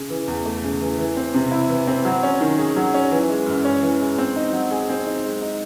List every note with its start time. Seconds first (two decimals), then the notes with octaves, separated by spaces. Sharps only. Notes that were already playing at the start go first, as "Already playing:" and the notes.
Already playing: C#3
0.10 E3
0.28 E2
0.45 A3
0.64 C#3
0.81 E3
0.98 E3
1.17 C4
1.34 C3
1.51 E4
1.69 E3
1.87 C4
2.05 F#3
2.23 C#4
2.41 D#3
2.58 G#4
2.77 F#3
2.94 C#4
3.12 E3
3.29 G#3
3.46 F#2
3.65 C#4
3.82 E3
4.00 G#3
4.18 C4
4.36 D#4
4.53 F#3
4.71 G#4
4.89 C4
5.06 D#4
5.24 G#3
5.42 D#4